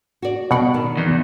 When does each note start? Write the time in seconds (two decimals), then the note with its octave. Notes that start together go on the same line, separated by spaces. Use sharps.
0.22 F#4 D5
0.51 B2 G3 D5 F#5
0.74 D#3
0.97 E2